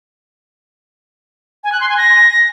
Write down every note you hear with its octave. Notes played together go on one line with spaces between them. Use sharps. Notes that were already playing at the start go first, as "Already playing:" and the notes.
G#5
F#6
C6
G#5
A#6